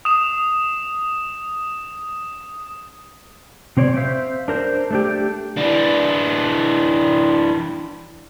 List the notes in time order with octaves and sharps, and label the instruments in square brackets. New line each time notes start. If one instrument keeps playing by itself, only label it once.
[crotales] D#6 E7
[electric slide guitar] C3 C4 C#5 D5
C5 E5 F5
D4 A#4 C5
A3 D4 G4
[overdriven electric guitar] E3 D4